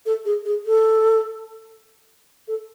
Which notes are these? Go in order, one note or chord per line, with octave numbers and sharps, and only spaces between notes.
A4
G#4
G#4
A4
A4